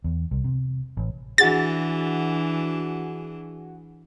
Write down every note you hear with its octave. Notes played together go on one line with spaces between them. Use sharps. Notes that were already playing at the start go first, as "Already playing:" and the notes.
E2
C2
C3
A1
E3 D4 F#4 G#4 A6